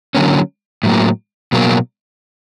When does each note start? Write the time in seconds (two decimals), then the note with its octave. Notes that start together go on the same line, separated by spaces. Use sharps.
0.15 D3 F#3 A#3 C#4
0.83 A2 F#3 A#3
1.52 B2 F#3 A#3